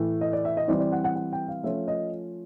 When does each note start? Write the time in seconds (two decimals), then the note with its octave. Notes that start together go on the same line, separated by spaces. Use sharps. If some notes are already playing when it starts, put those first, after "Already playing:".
Already playing: A2 E3 A3
0.21 D#5
0.33 D5
0.45 E5
0.57 D#5
0.68 E3 G3 C4 E4 D5
0.80 D5
0.92 F#5
1.04 F#5
1.16 F#5
1.32 G5
1.48 F5
1.64 F3 A3 C#4 F4 E5
1.88 D#5